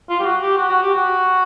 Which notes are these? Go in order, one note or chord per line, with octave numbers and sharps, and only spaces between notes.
F4
G4
F#4
G4
F#4
F#4
G4
F#4